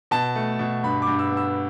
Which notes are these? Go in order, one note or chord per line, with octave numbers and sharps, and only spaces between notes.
B2 A5
A3
B2
G2 B5
D6
G2
E6
B3
E6